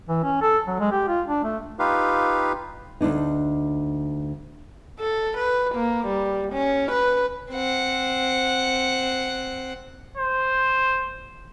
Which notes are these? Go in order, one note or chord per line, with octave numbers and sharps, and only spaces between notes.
E3
C#4
A4
F#3
G#3
G4
F4
D4
A3
D#4 F4 G4 B4 F5
D2 G2 D4 D#4
A4
B4
A#3
G3
C#4
B4
C4 F#5
C5